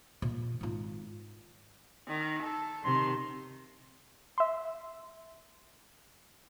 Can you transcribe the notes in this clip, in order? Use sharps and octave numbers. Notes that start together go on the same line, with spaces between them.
A#2
G#1 F4
D#3
A4
C3 D#3 C6
E5 C6